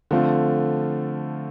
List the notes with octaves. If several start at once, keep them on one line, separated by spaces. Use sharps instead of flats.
D3 F3 A3 C4 F4